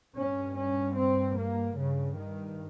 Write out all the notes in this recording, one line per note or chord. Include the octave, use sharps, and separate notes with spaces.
G2 C#4
C#4
C4
A#3
G2 C#3
D#3